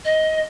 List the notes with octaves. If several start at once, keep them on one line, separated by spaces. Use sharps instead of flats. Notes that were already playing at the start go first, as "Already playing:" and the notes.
D#5